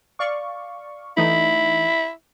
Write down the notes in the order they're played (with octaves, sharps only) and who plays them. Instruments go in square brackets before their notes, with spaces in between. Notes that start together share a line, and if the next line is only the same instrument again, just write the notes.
[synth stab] D5 F5 C#6
[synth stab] E3 A3 D#4 [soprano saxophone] E4